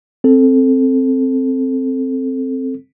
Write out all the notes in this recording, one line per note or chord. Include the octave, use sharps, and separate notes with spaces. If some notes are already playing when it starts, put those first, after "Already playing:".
C4 A4